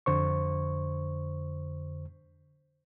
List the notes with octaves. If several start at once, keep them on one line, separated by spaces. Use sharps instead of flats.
F2 D3 C5 C#6